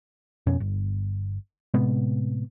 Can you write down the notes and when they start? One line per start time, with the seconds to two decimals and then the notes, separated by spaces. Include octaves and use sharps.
0.47 F2 B2 C#4
0.60 G1
1.74 A2 C3 G#3 B3